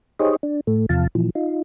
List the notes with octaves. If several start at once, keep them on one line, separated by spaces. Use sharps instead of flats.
D#4 G4 G#4 C5 C#5 D#5
D4
A2 A3
E2 C3 F3 F5 A5
A#2 E3 F3
D#4 F4